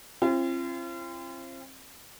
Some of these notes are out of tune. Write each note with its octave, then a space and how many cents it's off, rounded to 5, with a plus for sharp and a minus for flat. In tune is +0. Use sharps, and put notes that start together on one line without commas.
C4 +35 F4 -40